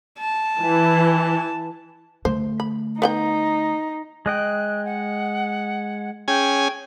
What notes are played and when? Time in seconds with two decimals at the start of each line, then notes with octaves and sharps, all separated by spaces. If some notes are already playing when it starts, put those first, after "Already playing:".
0.19 A5
0.60 E3
2.25 D3 A3 C5
2.60 B5
3.02 B3 D#4 F#5 G5
4.26 G#3 D#5 G5 F#6
4.85 F#5
6.28 C#4 G#4 G5 G#5